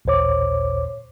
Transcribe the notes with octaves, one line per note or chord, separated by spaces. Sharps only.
A1 D#2 A#2 C5 C#5 D6